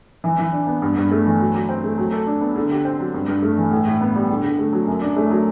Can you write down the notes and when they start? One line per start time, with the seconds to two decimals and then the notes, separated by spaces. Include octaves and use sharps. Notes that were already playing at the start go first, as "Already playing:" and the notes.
0.24 E3
0.39 E3
0.53 D4
0.67 B3
0.82 G2
0.97 G2
1.11 A3
1.26 E3
1.40 F#3
1.54 F#3
1.69 C4
1.84 A3
1.98 F#3
2.12 A4
2.27 D4
2.41 B3
2.56 D3
2.71 G4
2.85 C4
2.99 F#3
3.14 G2
3.28 G2
3.42 A3
3.57 E3
3.71 A2
3.86 A2
4.01 B3
4.15 G3
4.29 D3
4.43 D3
4.59 A3
4.73 F#3
4.87 F#2
5.02 D4
5.16 A3
5.31 F#3